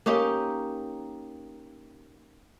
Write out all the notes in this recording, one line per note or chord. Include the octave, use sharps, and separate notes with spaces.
A#3 C#4 D#4 G4